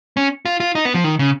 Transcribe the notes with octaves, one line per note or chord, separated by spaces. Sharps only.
C#4
F4
F4
D#4
B3
F3
D#3
C#3